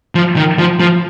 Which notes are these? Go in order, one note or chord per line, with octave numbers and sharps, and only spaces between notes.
F3
D#3
F3
F3